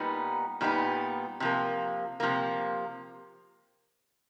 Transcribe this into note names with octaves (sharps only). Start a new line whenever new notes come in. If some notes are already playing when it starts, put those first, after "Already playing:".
Already playing: A#2 G3 B3 D#4
A#2 G3 B3 D#4
C3 F3 A#3
C3 F3 A#3